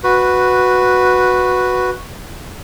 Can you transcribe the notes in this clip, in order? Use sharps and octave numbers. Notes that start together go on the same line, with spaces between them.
F#4 B4